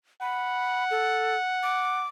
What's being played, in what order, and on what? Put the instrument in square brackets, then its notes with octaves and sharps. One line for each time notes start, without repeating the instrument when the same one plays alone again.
[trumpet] F#5 [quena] B5
[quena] A4
D6